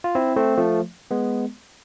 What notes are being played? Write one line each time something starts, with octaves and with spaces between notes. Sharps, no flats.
F4
C4 E4
A3 C4
F3 A3
G#3 B3